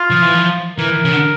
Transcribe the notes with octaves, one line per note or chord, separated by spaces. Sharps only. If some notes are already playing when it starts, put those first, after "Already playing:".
Already playing: F4
F3
E3
F3
E3 A#4
C#3
D3